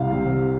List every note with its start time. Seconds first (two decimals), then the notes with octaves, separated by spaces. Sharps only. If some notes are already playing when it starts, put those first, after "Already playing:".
Already playing: C2 F5
0.12 C3